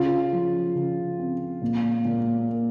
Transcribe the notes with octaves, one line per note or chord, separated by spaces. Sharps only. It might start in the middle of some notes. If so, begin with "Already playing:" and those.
Already playing: C#3 F4
F3
C#3
C4
A#2
A#2
A#3